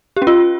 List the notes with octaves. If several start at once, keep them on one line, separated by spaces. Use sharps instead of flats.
G4
C#4
F4